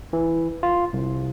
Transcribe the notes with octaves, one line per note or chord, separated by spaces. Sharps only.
E3
F4
C2